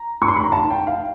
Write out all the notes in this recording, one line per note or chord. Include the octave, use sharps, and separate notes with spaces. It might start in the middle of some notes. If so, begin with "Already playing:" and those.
Already playing: A#5
C#6
C6
B5
A#5
A5
G5
F5